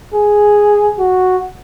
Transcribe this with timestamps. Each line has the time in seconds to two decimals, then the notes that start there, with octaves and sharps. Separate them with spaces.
0.15 G#4
0.99 F#4